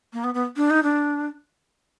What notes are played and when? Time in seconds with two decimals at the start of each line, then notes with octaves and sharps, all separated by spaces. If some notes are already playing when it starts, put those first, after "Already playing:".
0.13 A#3
0.24 B3
0.34 B3
0.57 D4
0.70 D#4
0.83 D4